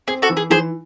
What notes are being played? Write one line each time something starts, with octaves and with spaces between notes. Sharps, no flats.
C4 G#4
F#4 A4
E3
G#4
E3 G#4 C5